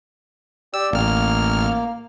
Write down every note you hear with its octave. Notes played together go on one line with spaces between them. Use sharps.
G4 D5 E6
A1 A#3 F6